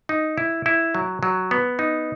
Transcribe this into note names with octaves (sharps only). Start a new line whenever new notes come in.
D#4
E4
E4
F#3
F#3
B3
D#4